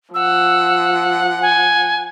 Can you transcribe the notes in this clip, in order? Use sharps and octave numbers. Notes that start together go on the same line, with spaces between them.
F3 F#5 E6
G#5